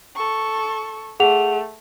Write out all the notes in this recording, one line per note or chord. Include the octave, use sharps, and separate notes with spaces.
A4 C#6
A3 G#4 F#5 F7